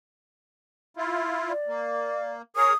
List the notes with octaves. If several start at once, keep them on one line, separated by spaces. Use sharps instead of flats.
E4 F4
D5
A#3
G#4 A#4 C#5 D#6